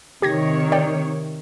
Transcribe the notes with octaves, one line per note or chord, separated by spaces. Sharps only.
C3 D#3 G4 C#5 G#6 A#6
D5 G5